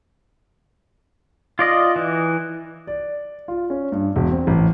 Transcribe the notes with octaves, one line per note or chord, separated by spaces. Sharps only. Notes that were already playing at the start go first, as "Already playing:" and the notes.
F4 D5 D#5
E3
D5
F4
C#4
G2
E1
C4
A1